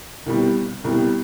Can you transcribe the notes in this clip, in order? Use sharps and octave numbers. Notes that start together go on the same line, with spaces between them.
C2 B2 G3
C2 B2 G3